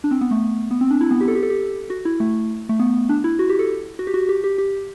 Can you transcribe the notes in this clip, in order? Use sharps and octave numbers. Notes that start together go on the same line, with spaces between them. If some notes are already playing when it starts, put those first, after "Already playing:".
D4
C4
B3
A3
B3
C4
D4
E4
B3
G4
A4
G4
A4
G4
F#4
E4
A3
A3
B3
D4
E4
F#4
G4
A4
F#4
G4
F#4
G4
G4
G4